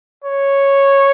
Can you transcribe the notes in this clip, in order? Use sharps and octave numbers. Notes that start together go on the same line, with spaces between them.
C#5